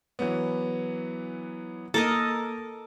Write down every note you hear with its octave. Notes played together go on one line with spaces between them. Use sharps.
E3 F#3 B3
A#3 A4 A#4 D#5